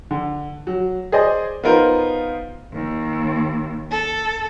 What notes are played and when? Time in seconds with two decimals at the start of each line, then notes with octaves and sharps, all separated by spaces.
0.11 D3
0.67 F#3
1.12 G#4 C5 D5 D#5
1.63 B3 D#4 F4 A#4 C5
2.73 D#2
3.90 A4